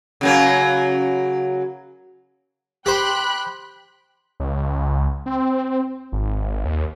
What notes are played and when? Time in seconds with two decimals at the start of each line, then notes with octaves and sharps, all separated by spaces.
0.21 C#3 F#3 A#3
2.86 G4 C5 G5 B5 F#6
4.40 C#2
5.26 C4
6.12 G#1
6.65 D#2